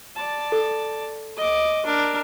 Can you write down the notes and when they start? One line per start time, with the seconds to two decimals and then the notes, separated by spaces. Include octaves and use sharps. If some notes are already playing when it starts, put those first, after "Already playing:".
0.17 D5 A5
0.52 A4
1.37 D#5 D6
1.85 D4 A#4